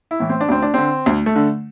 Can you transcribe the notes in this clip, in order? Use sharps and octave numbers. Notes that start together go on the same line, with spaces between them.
E4
A2 E3
C4
D4
D2 C4
D4
D3 C4
D2
A3
D3